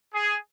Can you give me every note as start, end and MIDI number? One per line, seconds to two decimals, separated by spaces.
0.14 0.36 68